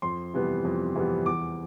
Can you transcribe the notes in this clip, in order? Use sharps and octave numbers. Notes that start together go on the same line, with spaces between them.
F2 C6
C3 E3 G3 B3
F2
C3 E3 G3 B3
E2 D6